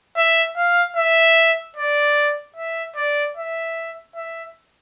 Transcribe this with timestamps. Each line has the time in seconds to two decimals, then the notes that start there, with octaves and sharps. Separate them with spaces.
0.17 E5
0.57 F5
0.96 E5
1.77 D5
2.56 E5
2.96 D5
3.37 E5
4.15 E5